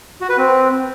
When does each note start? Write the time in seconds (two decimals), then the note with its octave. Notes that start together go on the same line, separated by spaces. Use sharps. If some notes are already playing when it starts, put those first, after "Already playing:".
0.21 F#4
0.29 B4
0.38 C4